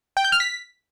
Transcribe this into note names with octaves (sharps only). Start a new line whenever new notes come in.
G5
G6
F6
B6